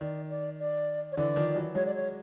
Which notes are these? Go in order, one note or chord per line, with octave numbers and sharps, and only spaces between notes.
D#3 D5
D5
D5
C#5
D3 E3 D5
D#3 F3
E3 F#3
F#3 G#3 C#5
D5
C#5